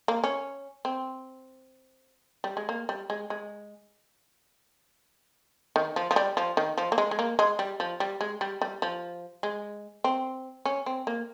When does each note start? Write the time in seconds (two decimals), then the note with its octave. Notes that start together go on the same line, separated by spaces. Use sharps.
0.08 A#3
0.24 C#4
0.85 C4
2.44 G3
2.57 G#3
2.69 A#3
2.89 G3
3.10 G#3
3.30 G#3
5.76 D#3
5.96 F3
6.11 F3
6.16 G3
6.37 F3
6.57 D#3
6.78 F3
6.92 A#3
6.98 G#3
7.11 G#3
7.19 A#3
7.39 G#3
7.59 G3
7.80 F3
8.00 G3
8.21 G#3
8.41 G3
8.62 G3
8.82 F3
9.43 G#3
10.04 C4
10.65 C#4
10.86 C4
11.07 A#3